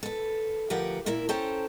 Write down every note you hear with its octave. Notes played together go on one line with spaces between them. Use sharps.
A4 B4
D2 F3 G4 A#4 B4 F#5
A#2 E4 A#4 E5
C#4 A4 C5 G5 A5 A#5